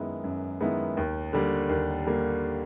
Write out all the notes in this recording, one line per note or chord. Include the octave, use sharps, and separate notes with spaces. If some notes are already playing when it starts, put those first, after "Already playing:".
Already playing: F#2 D#3 G#3 B3 E4
F#2
D#3 G#3 B3 E4
D#2
D3 G3 A#3
D#2
D3 G3 A#3